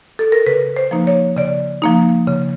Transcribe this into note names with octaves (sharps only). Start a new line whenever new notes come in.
A4
A#4
C#3 B4
C5
F3 A#3 D#4
C#5
C#3 D5
F3 A#3 D#4
C#3